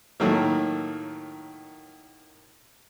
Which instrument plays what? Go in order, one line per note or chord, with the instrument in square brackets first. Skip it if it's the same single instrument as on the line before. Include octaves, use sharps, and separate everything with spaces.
[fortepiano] A2 D#3 F#3 A3 A#3